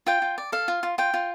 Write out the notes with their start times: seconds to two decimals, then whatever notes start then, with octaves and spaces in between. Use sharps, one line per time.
0.06 F4 G5
0.22 F4
0.38 D5
0.52 A4 F5
0.68 F4
0.83 F4
0.98 F4 G5
1.14 F4